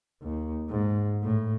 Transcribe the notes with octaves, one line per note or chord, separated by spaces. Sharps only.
D#2
G#2
A2